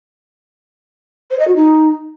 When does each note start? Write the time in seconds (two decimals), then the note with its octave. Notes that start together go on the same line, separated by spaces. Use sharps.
1.31 C5
1.39 D#5
1.47 F#4
1.56 D#4